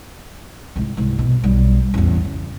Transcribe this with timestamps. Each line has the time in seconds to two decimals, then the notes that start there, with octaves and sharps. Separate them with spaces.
0.76 C2 G#2
0.97 C2 G#2
1.19 B2
1.43 B1 G3
1.94 A1 E2
2.25 C#3